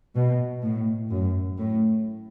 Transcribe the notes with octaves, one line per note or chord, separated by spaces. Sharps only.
B2
A2
F#2
A2